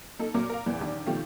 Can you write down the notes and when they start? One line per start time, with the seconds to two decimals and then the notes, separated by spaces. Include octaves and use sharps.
0.19 A#3 D#4 A4
0.34 A#2 F#3 A#3 A#4 D6
0.50 A#4 F5
0.66 E2 A#2 E3
0.81 A#1 D#3 G3 D6
1.06 B2 D#3 F3 A3 F4 G4